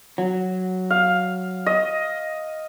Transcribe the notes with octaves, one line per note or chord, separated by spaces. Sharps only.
F#3
F5
D#5